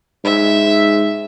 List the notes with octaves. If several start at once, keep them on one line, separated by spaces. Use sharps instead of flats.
G#2 E5